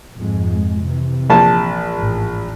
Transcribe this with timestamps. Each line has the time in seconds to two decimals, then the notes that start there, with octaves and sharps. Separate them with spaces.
0.16 F2 G#2 G#3
0.83 C3 E3
1.30 A#1 A5
1.92 A1 G#2